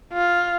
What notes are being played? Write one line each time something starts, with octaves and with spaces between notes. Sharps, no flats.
F4